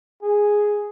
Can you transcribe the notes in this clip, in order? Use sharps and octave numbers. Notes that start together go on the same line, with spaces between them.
G#4